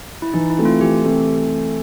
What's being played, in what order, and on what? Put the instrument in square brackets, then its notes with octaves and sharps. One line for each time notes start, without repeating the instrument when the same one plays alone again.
[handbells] E4
[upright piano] E3 [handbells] D#4
[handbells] E4
[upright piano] A3 C4
[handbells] F4
[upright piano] E3 [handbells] G4
[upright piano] A3 C4